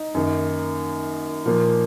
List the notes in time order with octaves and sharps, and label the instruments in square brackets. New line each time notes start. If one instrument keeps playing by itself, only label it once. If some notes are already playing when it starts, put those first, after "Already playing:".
Already playing: [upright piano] D#4
F#2 D#3 A#3
A#2 F3 A#3